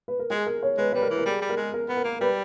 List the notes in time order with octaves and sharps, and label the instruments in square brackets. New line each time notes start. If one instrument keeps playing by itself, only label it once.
[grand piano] B4
A#4
[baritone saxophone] G#3 [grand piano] G#4
[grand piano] A#4
C#5
[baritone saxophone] G#3 [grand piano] B4
[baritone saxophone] G3 [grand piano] B4
[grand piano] A#4
[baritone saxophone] E3
[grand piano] A#4
[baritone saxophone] G3 [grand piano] G#4
[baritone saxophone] G3
[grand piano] A#4
[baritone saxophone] G#3
[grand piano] A#4
[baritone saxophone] B3
[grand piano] A#4
[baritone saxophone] A#3
[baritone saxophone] G3 [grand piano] B4